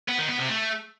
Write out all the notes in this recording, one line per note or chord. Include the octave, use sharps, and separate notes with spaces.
B3
D#3
B3
C3
A3